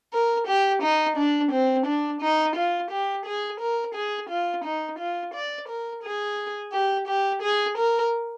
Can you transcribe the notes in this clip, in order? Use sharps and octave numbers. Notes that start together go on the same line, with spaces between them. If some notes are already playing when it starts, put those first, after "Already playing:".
A#4
G4
D#4
D4
C4
D4
D#4
F4
G4
G#4
A#4
G#4
F4
D#4
F4
D5
A#4
G#4
G4
G4
G#4
A#4